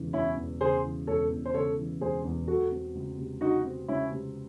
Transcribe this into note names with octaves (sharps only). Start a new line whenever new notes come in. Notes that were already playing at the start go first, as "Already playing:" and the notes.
Already playing: E1 E2 C#3 E3
E1 C#4 E4
E2
C#3 G#4 C5
E3
E1 A4 C#5
E2
C5
C#3 A4 C#5
E3
E1 G#4 C5
E2
F#3 F#4 A4
C4
C#2
C3
F#3 D#4 F#4
C4
C#2 C#4 E4
C3